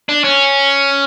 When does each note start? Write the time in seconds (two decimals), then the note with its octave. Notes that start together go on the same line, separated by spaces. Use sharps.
0.09 D4
0.24 C#4